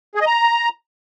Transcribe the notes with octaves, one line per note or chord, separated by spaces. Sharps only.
G#4
D#5
A#5